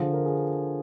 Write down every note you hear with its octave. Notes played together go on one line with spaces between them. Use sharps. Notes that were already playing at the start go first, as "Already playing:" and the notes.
Already playing: D3 F3 G#4
A#4
G#4